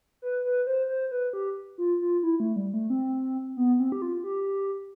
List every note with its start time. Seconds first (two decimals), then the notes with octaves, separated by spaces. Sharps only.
0.22 B4
0.45 B4
0.67 C5
0.89 C5
1.11 B4
1.33 G4
1.78 F4
2.01 F4
2.23 E4
2.40 A3
2.56 G3
2.74 A3
2.90 C4
3.57 B3
3.80 C4
3.92 G4
4.02 F4
4.24 G4